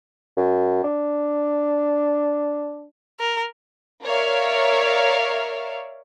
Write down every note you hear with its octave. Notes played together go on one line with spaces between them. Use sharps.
F#2
D4
A#4
A#4 C#5 D5 E5 F5